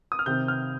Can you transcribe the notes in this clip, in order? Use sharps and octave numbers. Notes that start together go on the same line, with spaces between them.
D#6
F6
C3 D#3 C4 G6
F6